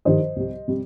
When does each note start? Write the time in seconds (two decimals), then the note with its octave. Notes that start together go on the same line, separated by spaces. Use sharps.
0.05 G2 D#3 G3 C5 D#5
0.36 C2 C3 G3
0.68 C3 G3